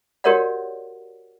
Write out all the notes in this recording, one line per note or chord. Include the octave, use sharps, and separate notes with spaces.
F#4 G4 A#4 C#5 D5 F#5